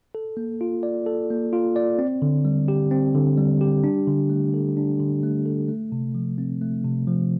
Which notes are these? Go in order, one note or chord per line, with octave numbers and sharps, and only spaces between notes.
A4
A#3
F4
D5
A4
A#3
F4
D5
C4
D3
G3
G4
C4
D3
G3
G4
D4
D3
A3
A4
D4
D3
A3
A4
A3
C3
F3
C4
A3
C3
F3